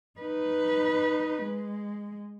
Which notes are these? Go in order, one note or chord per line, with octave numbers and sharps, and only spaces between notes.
D#4 B4
G#3